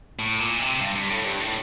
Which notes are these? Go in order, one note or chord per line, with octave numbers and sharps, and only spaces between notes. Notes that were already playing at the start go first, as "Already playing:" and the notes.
A2
A#2
C3
G2
G2
A2
G2
A2